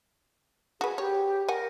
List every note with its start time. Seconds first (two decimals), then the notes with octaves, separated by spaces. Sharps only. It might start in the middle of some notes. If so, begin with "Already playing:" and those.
0.81 F#4 G#4 B4
0.98 G4 C#5
1.48 A#4 F#5 G#5